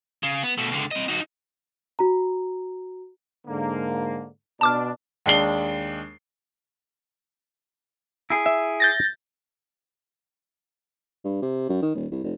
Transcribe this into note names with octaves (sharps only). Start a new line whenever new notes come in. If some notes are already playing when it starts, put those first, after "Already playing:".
C#3
B3
B2 A3
C#2 D3
C4 D#5
D#4 F#4
F#4 A#5
G#2 D3 A#3
B2 D4 A5 D6 F6
D#2 G#3 D4 C7 G7
E4 G#4
E5
G6 A6 A#6
G2
C3
F#2
D#3
D#1
C2
F1